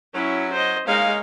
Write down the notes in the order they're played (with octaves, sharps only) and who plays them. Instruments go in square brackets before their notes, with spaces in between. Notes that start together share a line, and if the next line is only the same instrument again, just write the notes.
[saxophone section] F#3 [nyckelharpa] C#4 E4
[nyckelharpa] C5 D#5
[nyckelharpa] G#3 F5 [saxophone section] A#3 C#4 D#4